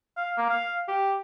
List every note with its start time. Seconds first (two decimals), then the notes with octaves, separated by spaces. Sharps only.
0.17 F5
0.38 A#3
0.50 F5
0.88 G4